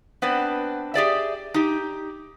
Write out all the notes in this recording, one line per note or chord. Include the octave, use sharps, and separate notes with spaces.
B3 C4 D4 B4
G4 G#4 D5 E5
D#4 G4